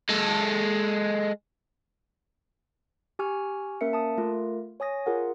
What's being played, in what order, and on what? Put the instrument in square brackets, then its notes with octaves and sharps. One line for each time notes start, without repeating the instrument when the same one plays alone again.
[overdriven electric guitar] G#3 A4
[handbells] G4 G#5 C#6 F6
A#3 C#4 A#4 E5 C#7
A5 D#6
A3 F4 A#4
C#5 G#5 D#6 A#6
F4 G#4 A#4 F#5